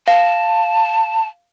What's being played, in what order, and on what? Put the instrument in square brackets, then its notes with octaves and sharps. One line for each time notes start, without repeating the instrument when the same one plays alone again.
[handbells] F5 [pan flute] A5